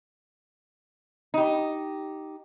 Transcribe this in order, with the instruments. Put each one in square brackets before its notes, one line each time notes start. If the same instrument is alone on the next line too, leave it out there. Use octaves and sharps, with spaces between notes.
[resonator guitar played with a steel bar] D#4 G4